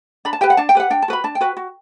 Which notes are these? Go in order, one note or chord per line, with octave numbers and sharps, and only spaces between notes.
D4 B5
A5
G4 B4 G5
F#5
D4 A5
G5
G4 B4 F#5
D4 G5
A5
F#4 B4 B5
D4 A5
G5
F#4 B4
F#4